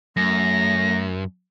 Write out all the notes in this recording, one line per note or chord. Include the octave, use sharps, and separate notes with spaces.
F#2 A3 A#6